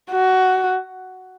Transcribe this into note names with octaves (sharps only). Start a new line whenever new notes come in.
F#4